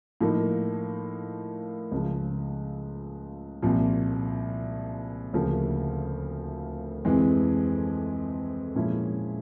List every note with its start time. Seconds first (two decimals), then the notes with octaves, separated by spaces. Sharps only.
0.21 A2 F3 A#3 D#4
1.92 C#2 C#3 F3
3.62 C2 A#2 F3
5.33 D2 C#3 F3 A#3
7.05 F2 C3 E3 G#3
8.75 A#2 F3 G#3 C#4 E4